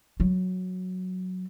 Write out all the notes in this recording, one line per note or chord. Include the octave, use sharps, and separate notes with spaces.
F#3